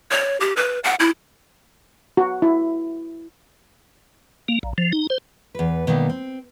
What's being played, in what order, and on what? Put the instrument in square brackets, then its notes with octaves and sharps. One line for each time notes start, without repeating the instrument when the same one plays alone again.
[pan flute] C#5
G4
B4
F#5
E4
[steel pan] F#4
E4
[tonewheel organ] A#3
A#1
F3
D#4
C5
[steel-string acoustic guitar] E2 B4
B2 D#3 G3 A#3
C4